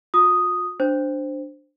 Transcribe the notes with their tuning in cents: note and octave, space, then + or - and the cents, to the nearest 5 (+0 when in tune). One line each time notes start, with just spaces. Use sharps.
F4 +45 D#6 +0
D4 +0 C5 +0